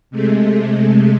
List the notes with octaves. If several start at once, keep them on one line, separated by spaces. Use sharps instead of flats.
C3 G#3 A3